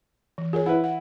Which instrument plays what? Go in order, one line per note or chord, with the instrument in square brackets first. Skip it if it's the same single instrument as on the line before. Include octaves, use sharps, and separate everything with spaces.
[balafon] E3
[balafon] F4 A#4 C#5 [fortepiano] G#4
[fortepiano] E4 B4 [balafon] F#5
[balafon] F#5